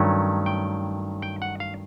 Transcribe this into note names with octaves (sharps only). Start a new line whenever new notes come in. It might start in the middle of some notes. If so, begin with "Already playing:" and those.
Already playing: G2 D#3 F#3 A3 C#4
G5
G5
F#5
F5